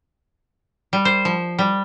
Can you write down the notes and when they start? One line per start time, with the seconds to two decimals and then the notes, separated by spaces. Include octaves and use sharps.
0.93 G3
1.05 C5
1.25 F3
1.59 G3